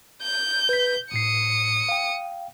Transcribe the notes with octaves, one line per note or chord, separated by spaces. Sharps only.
G6
B4 B6
G#1 A2 D#6 C7 C#7
F5 G5